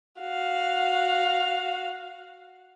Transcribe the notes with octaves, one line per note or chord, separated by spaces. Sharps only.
F#4 F5